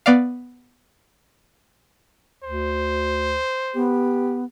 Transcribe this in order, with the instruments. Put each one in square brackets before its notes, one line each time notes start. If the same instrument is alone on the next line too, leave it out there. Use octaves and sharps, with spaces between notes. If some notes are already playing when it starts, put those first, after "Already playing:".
[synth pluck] B3 D5 F5
[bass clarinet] D2 [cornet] C5
[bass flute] B3 [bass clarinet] G4